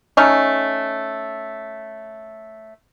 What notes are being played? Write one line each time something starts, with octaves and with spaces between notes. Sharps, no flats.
A3 C#4 D#4